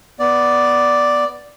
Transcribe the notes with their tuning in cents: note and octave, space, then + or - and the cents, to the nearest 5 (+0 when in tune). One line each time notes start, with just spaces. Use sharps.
B3 +0 D5 +0